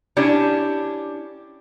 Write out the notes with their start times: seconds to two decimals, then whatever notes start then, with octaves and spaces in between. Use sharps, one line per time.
0.17 C#4 D4 E4 G4